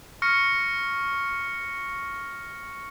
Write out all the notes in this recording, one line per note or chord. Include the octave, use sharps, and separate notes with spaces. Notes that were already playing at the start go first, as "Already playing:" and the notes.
C#6 F6 A#6 C#7